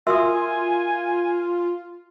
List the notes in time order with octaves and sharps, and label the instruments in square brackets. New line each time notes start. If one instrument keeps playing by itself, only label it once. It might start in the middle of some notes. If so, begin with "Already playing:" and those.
[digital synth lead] F4 [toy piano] F#4 E5 E6 [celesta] A#4 C6 D#6 [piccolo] G#5